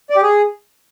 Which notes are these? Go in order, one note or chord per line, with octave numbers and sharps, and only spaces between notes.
D5
G4
G#4